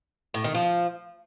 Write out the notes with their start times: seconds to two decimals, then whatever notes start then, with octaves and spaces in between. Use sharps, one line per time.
0.34 A2
0.44 D#3
0.54 F3